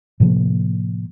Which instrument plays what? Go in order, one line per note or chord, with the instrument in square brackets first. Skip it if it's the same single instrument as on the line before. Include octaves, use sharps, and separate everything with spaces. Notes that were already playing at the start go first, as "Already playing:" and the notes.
[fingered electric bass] A2 C3 F3 A#3